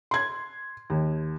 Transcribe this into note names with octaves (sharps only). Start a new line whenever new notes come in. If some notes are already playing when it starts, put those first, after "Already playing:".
C6 G#6
D#2